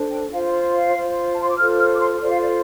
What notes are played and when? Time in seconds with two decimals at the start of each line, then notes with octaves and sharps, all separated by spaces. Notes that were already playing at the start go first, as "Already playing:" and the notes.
Already playing: D4 A4 C5
0.10 G5
0.31 F4 C5 F5
0.73 F5
0.94 F4 C5
1.33 A5
1.41 C6
1.49 D6
1.57 F4 A4 C5 F6
1.78 F6
1.95 D6
1.99 C6
2.20 F4 A4 C5 D5
2.30 F5
2.39 D5